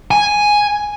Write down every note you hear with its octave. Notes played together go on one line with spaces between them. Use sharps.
G#5